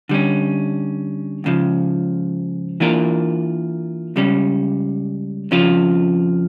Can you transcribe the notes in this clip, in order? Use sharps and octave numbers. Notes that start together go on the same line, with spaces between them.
D3 G3 C#4
C#2 C#3 F3
E3 A#3 D4 F4 A#4
C#2 C#3 G3 C#4
F2 C#3 F3 C#4 F4